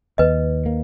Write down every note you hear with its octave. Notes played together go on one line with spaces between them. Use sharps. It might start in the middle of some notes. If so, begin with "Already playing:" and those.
D#2 B4 D#5
A#3